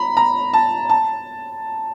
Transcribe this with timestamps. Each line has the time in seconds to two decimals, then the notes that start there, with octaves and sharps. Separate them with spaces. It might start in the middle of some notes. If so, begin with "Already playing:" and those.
Already playing: A#5 B5
0.17 A#5
0.53 A5
0.89 A5